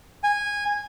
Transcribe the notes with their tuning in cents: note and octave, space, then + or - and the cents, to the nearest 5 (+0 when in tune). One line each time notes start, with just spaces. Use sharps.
G#5 -15